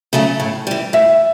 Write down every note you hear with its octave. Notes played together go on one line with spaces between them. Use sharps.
C#3 F#3 A3 D4
A2
E3 G3
A2 E5